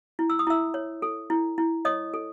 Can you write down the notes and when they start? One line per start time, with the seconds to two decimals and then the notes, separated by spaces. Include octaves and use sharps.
0.19 E4
0.30 E6
0.39 D#6
0.47 E4 E5 E6
0.74 C#5
1.02 A4
1.30 E4
1.58 E4
1.85 C#5 D#5 D#6
2.14 A4